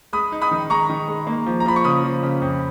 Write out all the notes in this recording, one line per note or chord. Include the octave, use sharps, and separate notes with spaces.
G#3 B5 D#6
D#4
B5 D#6
D#3
G#3 A#5 C#6
D#3
G#3
A#3
F3
A#5
F3 B5
C#6
C#3 B5 D#6
F3
C#3
F2